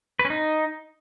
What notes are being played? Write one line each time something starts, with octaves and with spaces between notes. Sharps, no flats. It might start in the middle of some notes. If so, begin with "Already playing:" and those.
B4
C#4
D#4